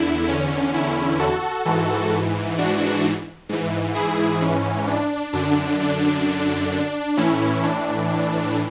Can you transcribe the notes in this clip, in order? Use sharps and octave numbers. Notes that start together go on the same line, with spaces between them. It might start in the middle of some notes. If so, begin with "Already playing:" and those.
Already playing: E2 D3 E4
C#4
C#4 E4
F#4 A4
G#2 E3 F#4 A4
D4 F#4
G#2 E3
E4 G#4
C#4
D4
F#2 D3 D4
D4
D4
A2 E3 C#4 E4
D4
D4